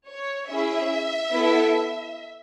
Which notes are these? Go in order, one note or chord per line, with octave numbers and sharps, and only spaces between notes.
C#5
C#4 E4 G#4 E5
B3 E4 A4